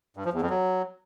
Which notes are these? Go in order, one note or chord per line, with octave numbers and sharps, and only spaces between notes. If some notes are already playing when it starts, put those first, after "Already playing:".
G2
F3
E2
F2
F#3